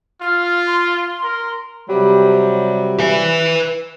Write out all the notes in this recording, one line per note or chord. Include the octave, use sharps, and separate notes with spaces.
F4 F6
C6
A#4
C3 F#3 G3
B4 E5